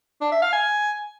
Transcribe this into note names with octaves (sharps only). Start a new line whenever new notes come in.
D4
E5
F5
G#5